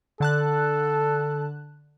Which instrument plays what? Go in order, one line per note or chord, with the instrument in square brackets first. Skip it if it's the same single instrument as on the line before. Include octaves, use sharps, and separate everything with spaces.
[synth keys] D3 A5 F#6 [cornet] A4